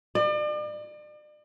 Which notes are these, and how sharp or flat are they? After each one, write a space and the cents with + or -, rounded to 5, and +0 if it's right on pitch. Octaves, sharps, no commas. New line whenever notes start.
D5 +40